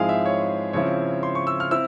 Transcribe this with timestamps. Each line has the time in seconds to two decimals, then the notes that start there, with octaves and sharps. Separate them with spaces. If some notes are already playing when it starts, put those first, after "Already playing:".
Already playing: G#2 F3 G#3 C4 E4 G#4 F5
0.09 E5
0.25 C#5
0.73 C#3 F3 C4 E4 C#5
1.23 C6
1.35 C#6
1.47 E6
1.60 F6
1.71 C4 E4 E6